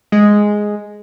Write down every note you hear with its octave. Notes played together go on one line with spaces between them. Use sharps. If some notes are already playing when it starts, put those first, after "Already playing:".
G#3